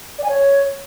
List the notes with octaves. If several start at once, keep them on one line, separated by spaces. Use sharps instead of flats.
D5
G#5
C#5